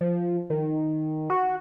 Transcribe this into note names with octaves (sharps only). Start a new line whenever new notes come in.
F3
D#3
F#4